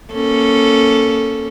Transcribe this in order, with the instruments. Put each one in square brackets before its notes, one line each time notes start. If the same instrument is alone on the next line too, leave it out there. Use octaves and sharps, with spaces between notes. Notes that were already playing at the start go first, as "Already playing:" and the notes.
[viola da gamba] A#3 C#4 A4